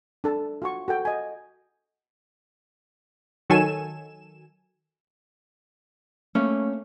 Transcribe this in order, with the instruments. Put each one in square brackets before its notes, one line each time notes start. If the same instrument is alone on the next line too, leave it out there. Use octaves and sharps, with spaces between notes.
[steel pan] D4 A4 A5
F4 F#4 C#6
F#4 A4 G5
D#5 G#5
[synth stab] D#3 F#3 A4 G#5 E7
[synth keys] A3 A#3 [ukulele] C#4